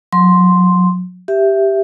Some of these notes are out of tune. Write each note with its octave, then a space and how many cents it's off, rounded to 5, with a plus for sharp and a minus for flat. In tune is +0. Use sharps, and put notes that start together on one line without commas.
F#3 -30 C6 +0
G4 +0 E5 +5